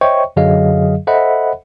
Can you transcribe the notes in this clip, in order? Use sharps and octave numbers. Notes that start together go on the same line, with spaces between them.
C5 C#5 D#5 E5 G5 C#6
F#2 D3 F#3 G#4 D#5 F5
A4 C5 D#5 E5 F#5 B5